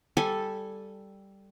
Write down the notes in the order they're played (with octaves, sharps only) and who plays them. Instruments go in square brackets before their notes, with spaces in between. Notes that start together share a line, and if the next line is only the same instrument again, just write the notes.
[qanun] G3 A4 G#5